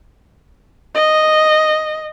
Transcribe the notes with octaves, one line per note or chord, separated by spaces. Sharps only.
D#5